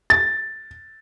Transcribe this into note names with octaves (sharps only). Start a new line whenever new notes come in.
A6